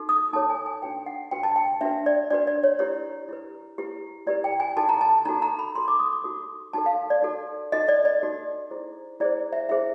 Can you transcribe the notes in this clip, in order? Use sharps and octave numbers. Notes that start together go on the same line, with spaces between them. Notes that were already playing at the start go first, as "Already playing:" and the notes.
Already playing: D#4 F#4 A4
D#6
D#4 F#4 A4 C#5 A5
G#5
G#5
D4 F#4 B4 G5
F#5
D4 F#4 B4 G5
A5
G5
D4 F#4 B4 E5
D5
D4 F#4 B4 D5
D5
C#5
E4 G4 B4 C#5
E4 G4 B4
E4 G4 B4
E4 G4 B4 D5
G5
G#5
D#4 F#4 A4 A5
A#5
A5
D#4 F#4 A4 A#5
A#5
B5
D#4 F#4 A4 C6
D6
D#6
C#6
D#4 F#4 A4
D#4 F#4 A4 A5
F5
D5
D#4 F#4 A4
D#4 F#4 A4 D#5
D5
D5
D#4 F#4 A4
E4 G#4 C5
E4 G#4 C5 D5
E5
E4 G#4 C5 E5